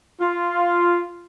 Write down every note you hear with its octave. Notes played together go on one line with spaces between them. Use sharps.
F4